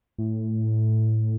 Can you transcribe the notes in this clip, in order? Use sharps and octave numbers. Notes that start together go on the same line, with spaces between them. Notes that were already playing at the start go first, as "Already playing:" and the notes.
A2